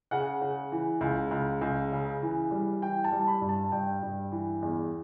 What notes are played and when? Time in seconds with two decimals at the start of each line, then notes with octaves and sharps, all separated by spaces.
0.11 C#3 F#5
0.42 C#3
0.72 E3
1.01 C#2
1.31 C#2
1.61 C#2
1.92 C#3
2.22 E3
2.51 G3
2.82 E3 G5
3.04 A5
3.12 G3
3.27 B5
3.41 G2
3.49 A5
3.72 G2 G5
4.03 G2
4.32 E3
4.62 E2